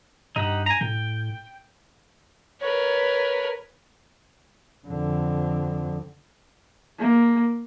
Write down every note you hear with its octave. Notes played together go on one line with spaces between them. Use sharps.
G2 D#4 G4 F#5
G#5 A#5
A2 G5
A#4 B4 C#5
F2 D3
A#3